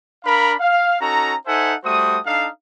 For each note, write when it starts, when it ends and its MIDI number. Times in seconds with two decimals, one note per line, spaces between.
0.25 0.53 62
0.25 0.53 70
0.25 0.53 77
0.25 0.53 83
0.59 0.99 77
1.01 1.35 61
1.01 1.35 63
1.01 1.35 66
1.01 1.35 69
1.01 1.35 82
1.47 1.73 63
1.47 1.73 69
1.47 1.73 72
1.47 1.73 76
1.47 1.73 78
1.47 1.73 80
1.85 2.19 55
1.85 2.19 57
1.85 2.19 66
1.85 2.19 72
1.85 2.19 87
2.26 2.47 62
2.26 2.47 63
2.26 2.47 69
2.26 2.47 77